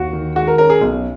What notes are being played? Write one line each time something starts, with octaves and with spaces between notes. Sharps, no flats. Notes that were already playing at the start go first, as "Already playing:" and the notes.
Already playing: D#2 F#4
D#3
G#3 F#4
A#4
C#4 A#4
G#4
B1